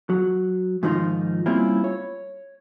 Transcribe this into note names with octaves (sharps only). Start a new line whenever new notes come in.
F#3
G#2 D#3 F3 D#4 F4
G3 A#3 C4 C#4 E4 F4
C#5